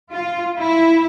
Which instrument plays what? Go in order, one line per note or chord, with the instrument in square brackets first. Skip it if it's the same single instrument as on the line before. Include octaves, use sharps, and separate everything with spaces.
[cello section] F4
E4